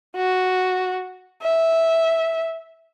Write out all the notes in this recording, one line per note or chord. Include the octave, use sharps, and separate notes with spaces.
F#4
E5